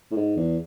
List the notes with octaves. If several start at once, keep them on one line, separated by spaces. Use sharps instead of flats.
A2
G#2
E2